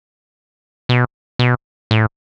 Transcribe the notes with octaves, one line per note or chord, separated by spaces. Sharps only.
B2
B2
A2